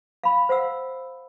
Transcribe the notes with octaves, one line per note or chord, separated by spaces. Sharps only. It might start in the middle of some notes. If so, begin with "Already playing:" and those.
F5 B5
C5 F5 F#5 E6